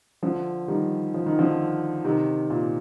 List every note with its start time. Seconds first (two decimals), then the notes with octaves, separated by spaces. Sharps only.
0.23 D3 F3
0.68 D#3 G3
1.14 F3
1.26 D#3
1.39 D3 F3
2.05 C3 D#3
2.50 A#2